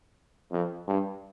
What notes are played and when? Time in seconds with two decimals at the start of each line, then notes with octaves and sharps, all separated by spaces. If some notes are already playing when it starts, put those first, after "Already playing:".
0.52 F2
0.88 G2